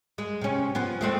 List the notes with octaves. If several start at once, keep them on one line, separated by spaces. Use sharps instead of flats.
G#3
C3 C#4
F3 B3
G#3 A3 C4